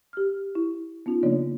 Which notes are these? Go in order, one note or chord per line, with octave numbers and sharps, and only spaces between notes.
G4 F6
E4
B3 C#4 D#4 F4
C#3 F3 A#3 D4 C#5 D5